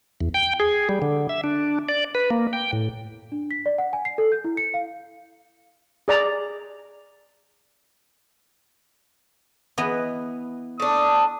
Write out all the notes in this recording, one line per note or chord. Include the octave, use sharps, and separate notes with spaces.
E2
G5
G#4
G3
D3
E5
D4
D5
B4
A#3
G5
A2
D4
B6
D5
F#5
G#5
C7
A4
G6
E4
C#7
F5
G#4 D5 A#5
E3 B3 D#5
A3 D4 D#6